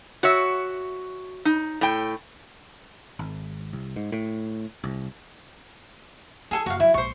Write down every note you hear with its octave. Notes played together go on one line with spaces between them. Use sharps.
F#4 C#5 E5
D#4
A2 G5
G#1
C2
G#2
A2
C2
E4 G#4 A4 G#5
F#1 F#4 F5
F#3 E4
A#1 G#2 C5 C#6